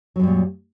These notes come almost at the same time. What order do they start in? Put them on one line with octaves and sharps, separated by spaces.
F#3 F#2 G3 A#2